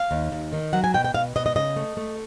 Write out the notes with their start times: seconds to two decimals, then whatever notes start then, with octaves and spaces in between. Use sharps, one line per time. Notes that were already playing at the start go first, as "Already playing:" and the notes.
Already playing: F5
0.11 D#2
0.32 D#2
0.53 D#3
0.73 F#3 F#5
0.84 G#5
0.94 B2 G5
1.04 G5
1.14 B2 F5
1.36 B2 D#5
1.46 D#5
1.56 C#3 D#5
1.76 A3
1.97 A3